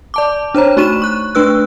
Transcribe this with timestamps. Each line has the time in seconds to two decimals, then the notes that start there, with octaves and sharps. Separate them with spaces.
0.14 D5 A5 D6
0.55 D4 C5 C#5 A#5
0.77 A3 D#4 F#4 C#6 D#7 E7
1.02 C#6 F#6
1.35 A3 D4 B4 E6 F#6